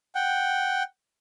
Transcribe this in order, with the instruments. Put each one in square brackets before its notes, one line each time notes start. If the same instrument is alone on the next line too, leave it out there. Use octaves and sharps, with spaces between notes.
[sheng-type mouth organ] F#5 G5